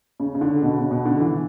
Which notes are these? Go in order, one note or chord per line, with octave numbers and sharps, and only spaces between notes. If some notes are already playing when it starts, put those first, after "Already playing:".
C#3
C#3
D3
B2
C#3
B2
D3
E3